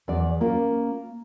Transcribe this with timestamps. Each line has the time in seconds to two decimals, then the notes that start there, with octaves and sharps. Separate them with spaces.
0.08 E2 D5
0.41 A#3 C#4 F4